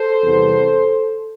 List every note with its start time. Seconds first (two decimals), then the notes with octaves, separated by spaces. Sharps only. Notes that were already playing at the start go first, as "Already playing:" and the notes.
Already playing: A4 C5
0.23 E2 C3 G3 B3